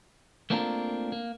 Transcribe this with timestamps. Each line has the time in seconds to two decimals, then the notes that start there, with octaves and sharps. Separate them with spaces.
0.50 A3 A#3 C4 D4 F4 A#4
1.12 A#3